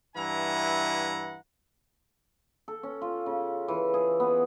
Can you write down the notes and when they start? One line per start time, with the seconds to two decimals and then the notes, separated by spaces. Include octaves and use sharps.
0.15 G2 E3 E4 F#5 G#5 A#5
2.68 A4
2.83 C#4
3.01 F4
3.26 C#3
3.68 E3
3.94 G#4
4.20 B3